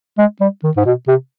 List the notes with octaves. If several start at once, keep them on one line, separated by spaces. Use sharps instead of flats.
G#3
G3
D#3
G#2
B2
C3